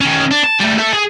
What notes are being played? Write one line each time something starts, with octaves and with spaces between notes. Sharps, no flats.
D#3 C#4
D4
A5
G3 A3
A4 E5
G#4